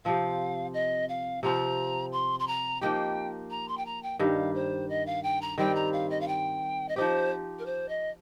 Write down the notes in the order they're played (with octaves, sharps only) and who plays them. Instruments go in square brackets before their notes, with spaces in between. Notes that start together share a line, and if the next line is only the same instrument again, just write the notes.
[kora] C3 F3 C4 [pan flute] F5
[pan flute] D#5
F5
[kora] C3 F3 C4 F4 [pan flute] A#5
[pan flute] C6
C6
A#5
[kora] F3 A#3 D#4 G4 [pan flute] G5
[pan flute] A#5
C6
G5
A#5
G5
[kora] G2 D#3 G3 [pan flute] F5
[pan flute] C5
D#5
F5
G5
A#5
[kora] D#3 G3 C4 [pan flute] G5
[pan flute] A#5
F5
D#5
F5
G5
D#5
[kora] F3 D#4 G4 [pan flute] C5
[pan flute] A#4
C5
D#5